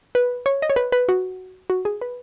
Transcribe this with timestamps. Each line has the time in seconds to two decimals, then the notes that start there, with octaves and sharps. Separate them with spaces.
0.15 B4
0.46 C#5
0.62 D#5
0.70 C#5
0.76 B4
0.92 B4
1.09 F#4
1.70 F#4
1.85 G#4
2.01 B4